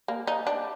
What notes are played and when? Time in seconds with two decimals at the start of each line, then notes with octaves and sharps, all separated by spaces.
0.08 A#3
0.27 D#4
0.47 D4